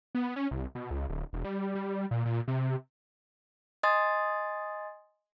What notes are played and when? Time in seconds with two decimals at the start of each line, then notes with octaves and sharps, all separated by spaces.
0.15 B3
0.36 C#4
0.51 C2
0.75 B2
0.91 C#2
1.09 D1
1.33 E1
1.45 G3
1.75 G3
2.11 A#2
2.26 A#2
2.48 C3
3.83 D#5 G#5 C6 D#6 A6